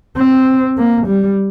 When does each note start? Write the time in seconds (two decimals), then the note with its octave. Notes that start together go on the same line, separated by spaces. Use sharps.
0.17 C4
0.77 A#3
1.07 G3